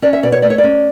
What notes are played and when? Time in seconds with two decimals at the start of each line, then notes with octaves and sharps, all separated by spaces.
0.02 C#4 D5
0.13 E5
0.23 B2 D5
0.32 C#5
0.42 A3 D5
0.50 C#5
0.58 D5
0.64 C#4